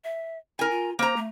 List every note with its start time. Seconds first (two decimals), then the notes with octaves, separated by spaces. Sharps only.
0.04 E5
0.59 E4 A#4 G#5
0.70 F4
0.99 A#3 C5 A#5
1.16 A3